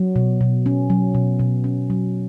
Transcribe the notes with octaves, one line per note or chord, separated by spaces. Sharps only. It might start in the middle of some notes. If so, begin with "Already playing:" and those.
Already playing: F#3
B2
B2
C#4
F#3
B2
B2
C#4
F#3